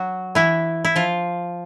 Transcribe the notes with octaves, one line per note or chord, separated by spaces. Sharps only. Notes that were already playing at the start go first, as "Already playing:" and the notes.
Already playing: F#3 F#4
E3 E4
E4
F3 F4